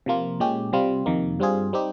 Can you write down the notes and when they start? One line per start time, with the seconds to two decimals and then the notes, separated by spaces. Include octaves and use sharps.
0.06 C3 F3 A#3 F4
0.40 A#2 G#3 C#4 G4
0.73 C3 G3 C4 F4
1.06 F2 C3 D#3 A#3
1.39 G2 G3 C4 F4 G#4
1.73 G3 C4 D#4 G4